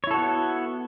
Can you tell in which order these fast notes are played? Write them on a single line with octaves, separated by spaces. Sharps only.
C#5 E4 A4 F#4 B3